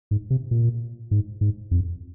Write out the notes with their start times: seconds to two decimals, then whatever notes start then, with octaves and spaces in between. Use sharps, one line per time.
0.11 G#2
0.30 C3
0.51 A#2
1.11 G#2
1.41 G#2
1.71 F2